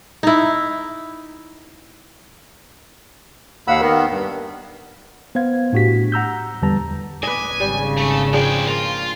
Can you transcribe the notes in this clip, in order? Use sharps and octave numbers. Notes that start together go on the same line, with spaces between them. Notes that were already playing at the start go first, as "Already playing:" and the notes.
D#4 E4
D#2 F5 F#5 B5 E6
D#3 B3 A#4
G2
B3 C5 F5 G#6
A2 D4 F#4 G4 B6
F#5 A#5 E6 G6
E2 D3 G3 B4 A5 A#5
B4 D#5 G#5 D6
G#1 C#3 G3
A3
F3 G#3 D4 G#4 G5
A#3 F4